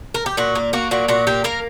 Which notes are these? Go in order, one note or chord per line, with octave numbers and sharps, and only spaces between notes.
A#4
G4
A#2 F#4
A#3
A#3 F#4
A#2 F#4
A#2 F#4
A#3 G4
A#3 A#4